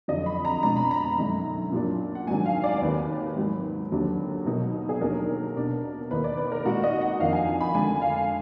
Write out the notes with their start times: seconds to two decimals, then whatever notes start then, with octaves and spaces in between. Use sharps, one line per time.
0.08 F2 D3 F#3 D#5
0.26 B5
0.45 A#5
0.63 B2 G#3 D4 A#5
0.76 B5
0.91 A#5
1.18 F#2 D3 G#3 D#4
1.72 A#2 F#3 A#3 D4
2.15 F#5
2.27 G#2 D#3 F#3 D4 G#5
2.46 F5
2.64 D5
2.78 D5
2.82 D#2 D#3 A#3 B4
3.36 G#2 D#3 F#3
3.91 D#2 D3 F#3 D4
4.46 B2 F#3 A#3 D#4
4.89 G#4
5.00 D#2 D#3 F#3 D4 A#4
5.56 B2 A#3 D4
6.11 D#2 D#3 A#3 D#4 B4
6.24 D5
6.37 B4
6.52 A#4
6.65 A#2 G#3 D#4 F#4
6.84 D#5
7.01 F#5
7.19 F2 D#3 A#3 D4 F5
7.33 G#5
7.61 B5
7.74 D3 G#3 D4 G#5
8.02 F5